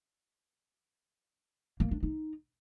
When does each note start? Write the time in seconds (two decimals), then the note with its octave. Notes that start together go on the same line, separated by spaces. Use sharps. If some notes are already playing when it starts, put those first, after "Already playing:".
1.80 A#3
1.91 D4
2.03 D#4